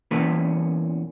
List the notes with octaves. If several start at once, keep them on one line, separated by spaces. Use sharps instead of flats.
E2 A#2 E3 A#3 C#4 B4